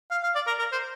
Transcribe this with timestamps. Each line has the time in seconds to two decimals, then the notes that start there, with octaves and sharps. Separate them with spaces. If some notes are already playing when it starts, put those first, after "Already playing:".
0.11 F5
0.23 F5
0.35 D5
0.47 A#4
0.59 A#4
0.72 C5